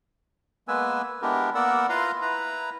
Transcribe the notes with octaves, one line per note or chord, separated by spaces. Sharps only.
G#3 A#3 B3 B4 G#5 E6
G#3 B3 D4 E4 G4 A#4
A#3 B3 A#4 D5 F#5 E6
E4 F4 B4 F5 A#5 C6
E4 B4 A#5